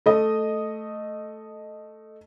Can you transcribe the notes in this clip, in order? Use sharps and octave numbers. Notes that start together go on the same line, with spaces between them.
A3 D#5